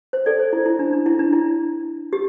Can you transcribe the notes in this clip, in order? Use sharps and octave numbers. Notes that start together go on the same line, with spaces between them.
C5
A4 D5
C5
E4
E4
D4
D4
E4
D4
E4
G4